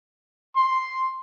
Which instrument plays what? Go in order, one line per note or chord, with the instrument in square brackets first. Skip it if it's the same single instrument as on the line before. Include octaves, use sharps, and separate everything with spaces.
[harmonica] C6